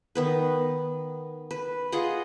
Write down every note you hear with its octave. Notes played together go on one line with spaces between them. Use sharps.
D#3 B3 B4
B4
F4 G#4 D#5 F#5